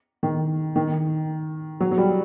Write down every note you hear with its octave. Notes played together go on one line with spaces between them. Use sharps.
D#3
D#3
F#3
F#3
G3